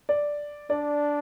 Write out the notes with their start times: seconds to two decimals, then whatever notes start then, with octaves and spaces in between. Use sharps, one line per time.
0.09 D5
0.70 D4 D5